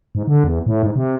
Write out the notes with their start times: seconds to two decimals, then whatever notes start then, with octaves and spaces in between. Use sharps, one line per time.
0.15 G#2
0.27 D3
0.44 E2
0.66 A2
0.83 G#2
0.96 C3